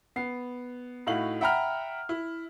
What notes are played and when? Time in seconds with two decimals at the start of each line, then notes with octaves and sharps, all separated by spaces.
0.16 B3 C7
1.07 A2 D#4 E4 F#4 F5 F#7
1.41 E5 F#5 G5 A#5 B5 F6
2.09 E4